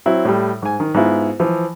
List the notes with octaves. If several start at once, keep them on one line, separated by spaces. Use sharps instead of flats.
F#3 C4 E4
A2 G3
G#2 G#5
D#3
G#2 B3 E4 F4
E3 F3